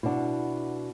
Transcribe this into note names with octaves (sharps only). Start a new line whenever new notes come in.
B2 D4 E4 F#5